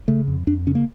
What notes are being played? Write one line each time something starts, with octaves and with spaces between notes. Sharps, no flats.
C#3 A3
F2
F2 D4
C#3 C#4
A#3